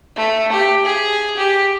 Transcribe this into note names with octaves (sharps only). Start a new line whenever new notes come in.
A3
G4
G#4
G4